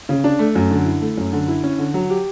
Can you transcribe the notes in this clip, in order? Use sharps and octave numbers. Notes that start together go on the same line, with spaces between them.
C#3
D4
A3
F#2
D3
E4
A3
F#2
D3
E4
C#4
D3
F#3
G4